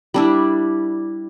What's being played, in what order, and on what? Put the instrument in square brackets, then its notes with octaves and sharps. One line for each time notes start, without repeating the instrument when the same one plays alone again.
[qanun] G3 D4 E4